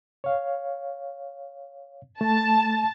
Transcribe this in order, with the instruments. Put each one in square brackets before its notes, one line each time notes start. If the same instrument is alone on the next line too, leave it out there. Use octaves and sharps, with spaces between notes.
[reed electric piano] C#5 F5
[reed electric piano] A3 [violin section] A5